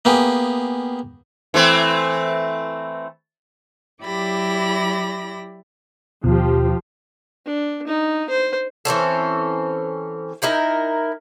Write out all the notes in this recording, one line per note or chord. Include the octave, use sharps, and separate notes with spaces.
A#3 B3 G4 G#4
E3 A3 C4
F#3 E4 G4 D5 B5 A#6
D#2 B2 F3 G4
D4
D#4
C5
E3 C4 C#4 A4
D#4 E4 A#4 G5